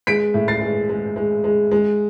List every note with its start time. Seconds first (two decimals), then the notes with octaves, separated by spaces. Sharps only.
0.07 G#3 B6 D7
0.34 A2
0.48 A6 C7
0.61 G#3
0.89 G#3
1.16 G#3
1.44 G#3
1.72 G#3